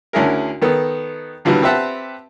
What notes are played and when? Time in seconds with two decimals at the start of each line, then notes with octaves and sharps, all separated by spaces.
0.13 D2 D3 C#4 E4 G#4 A#4
0.62 D#3 B3 A4
1.45 A#2 D3 E3 F#3 G3
1.62 C4 G4 B4 E5 F#5 A5